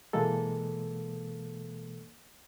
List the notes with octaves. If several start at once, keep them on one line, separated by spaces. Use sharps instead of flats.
B2 E3 G#3 A#3 A4